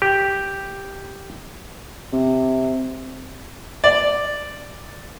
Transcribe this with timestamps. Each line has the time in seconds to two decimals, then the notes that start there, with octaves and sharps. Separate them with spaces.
0.02 G4
2.13 C3
3.84 D5